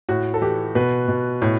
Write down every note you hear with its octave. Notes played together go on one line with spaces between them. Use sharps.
A2 F#4
A4
E3 G4
B2 B4
B2
A2